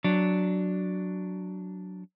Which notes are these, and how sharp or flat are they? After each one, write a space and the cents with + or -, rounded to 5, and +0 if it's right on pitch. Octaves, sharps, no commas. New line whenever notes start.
F#3 +0 D4 +0